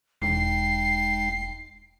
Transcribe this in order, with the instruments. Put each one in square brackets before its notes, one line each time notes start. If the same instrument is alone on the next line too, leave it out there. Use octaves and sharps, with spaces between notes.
[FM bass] E1 [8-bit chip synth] G#3 D#4 G5 [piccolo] C7